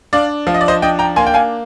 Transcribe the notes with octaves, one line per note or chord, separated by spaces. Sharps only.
D4 D5 F5
F3 F5
D#5
D5
C5 D#5
D4 D#5 G5
G5 A#5
A#3 G#5 C6
G5
F5 G#5